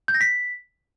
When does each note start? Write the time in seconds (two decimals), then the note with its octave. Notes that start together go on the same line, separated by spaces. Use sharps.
0.08 G6
0.14 A#6
0.21 B6